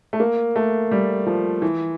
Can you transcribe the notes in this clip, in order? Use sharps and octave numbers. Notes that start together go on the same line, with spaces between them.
A3
A#3
A3
G3
F3
E3